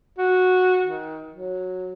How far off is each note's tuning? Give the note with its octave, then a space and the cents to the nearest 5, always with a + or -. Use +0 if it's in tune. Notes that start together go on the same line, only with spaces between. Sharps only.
F#4 -10
D#3 +25
F#3 -10